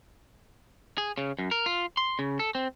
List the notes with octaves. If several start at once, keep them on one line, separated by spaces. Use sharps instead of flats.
G#4
C#3
F#2
A#4
F4
C6
C#3
A4
C4